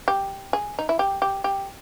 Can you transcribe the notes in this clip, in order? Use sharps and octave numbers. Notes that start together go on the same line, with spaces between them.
G4
G#4
D#4
E4
G4
G4
G4